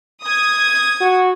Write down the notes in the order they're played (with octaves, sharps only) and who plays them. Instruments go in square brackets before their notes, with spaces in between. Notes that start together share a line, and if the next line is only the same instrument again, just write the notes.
[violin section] D#6 G#6
[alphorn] F#4